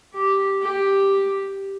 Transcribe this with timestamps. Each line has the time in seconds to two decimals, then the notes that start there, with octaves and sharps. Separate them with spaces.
0.14 G4
0.61 G4